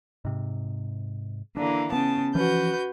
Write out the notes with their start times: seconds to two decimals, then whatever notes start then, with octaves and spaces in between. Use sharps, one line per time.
0.25 G#2 C3
1.57 D3 E3 A#3 D4
1.92 C#3 B3 A5
2.35 E3 F3 C#4 F#4 B4 G6